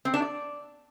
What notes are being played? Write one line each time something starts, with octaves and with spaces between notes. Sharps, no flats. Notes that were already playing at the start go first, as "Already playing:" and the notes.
C4
D4
D5